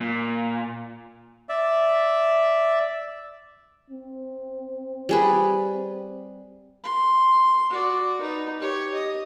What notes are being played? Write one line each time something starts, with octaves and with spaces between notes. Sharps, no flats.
A#2
D5 E5
C4
G3 G#4 B4
C6
F#4 D5
D#4 B4
G4 C#5
D#5